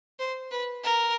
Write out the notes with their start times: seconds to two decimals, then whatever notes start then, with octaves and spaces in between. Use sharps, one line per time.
0.19 C5
0.51 B4
0.84 A#4